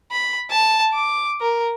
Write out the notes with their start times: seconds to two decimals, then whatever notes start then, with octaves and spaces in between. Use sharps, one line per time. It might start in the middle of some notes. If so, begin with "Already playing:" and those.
0.11 B5
0.51 A5
0.93 D6
1.41 A#4